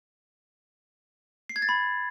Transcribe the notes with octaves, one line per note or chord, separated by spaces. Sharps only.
C7
G#6
A6
B5